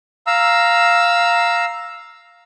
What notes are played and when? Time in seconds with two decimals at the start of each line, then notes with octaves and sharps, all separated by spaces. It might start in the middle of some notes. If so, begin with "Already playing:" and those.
0.27 F5 A#5 E6